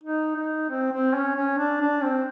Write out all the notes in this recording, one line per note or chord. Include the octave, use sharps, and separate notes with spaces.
D#4
D#4
C4
C4
C#4
C#4
D4
D4
C4